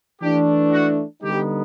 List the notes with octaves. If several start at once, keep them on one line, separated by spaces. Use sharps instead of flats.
E3 A3 D4 G4
F#4
D3 G3 B3 D#4 G4